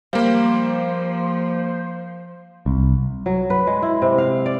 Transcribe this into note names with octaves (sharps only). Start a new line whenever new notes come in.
F3 G3 A#3 C5 F5
C2
F#3
B4
G#3
E4
C3
F5
D5